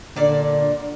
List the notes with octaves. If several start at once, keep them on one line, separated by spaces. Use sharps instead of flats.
A#2 D3 D5